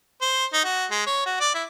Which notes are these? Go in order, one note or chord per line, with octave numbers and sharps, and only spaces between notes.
C5
D#4
F#4
G#3
C#5
F#4
D5
E4